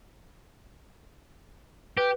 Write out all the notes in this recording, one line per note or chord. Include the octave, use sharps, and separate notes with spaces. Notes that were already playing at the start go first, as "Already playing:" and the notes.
G4 B4